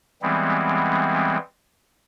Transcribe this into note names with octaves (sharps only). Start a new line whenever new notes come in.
E3 G3 G#3 B3 C4